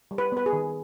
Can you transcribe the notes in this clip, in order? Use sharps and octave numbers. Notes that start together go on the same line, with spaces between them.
G3
B4
B3 B4
G#4
D#3